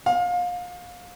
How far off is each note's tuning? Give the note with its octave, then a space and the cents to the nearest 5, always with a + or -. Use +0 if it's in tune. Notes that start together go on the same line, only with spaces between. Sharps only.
F5 +30